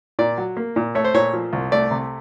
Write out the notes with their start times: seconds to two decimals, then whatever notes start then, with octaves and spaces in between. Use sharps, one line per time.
0.19 A#2 D5
0.38 F#3
0.57 A#3
0.76 A#2
0.95 A3 C#5
1.04 C5
1.14 A#2 C#5
1.33 F3
1.53 C2
1.72 A3 D5
1.91 C3